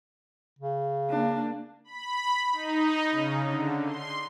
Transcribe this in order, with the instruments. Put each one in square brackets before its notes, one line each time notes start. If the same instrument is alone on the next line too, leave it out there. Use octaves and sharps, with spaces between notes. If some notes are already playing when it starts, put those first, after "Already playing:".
[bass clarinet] C#3
[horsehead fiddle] A#3 D4
[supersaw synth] B5
D#4
C#3
D3
C6